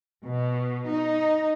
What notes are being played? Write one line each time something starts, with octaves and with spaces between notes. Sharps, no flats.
B2
D#4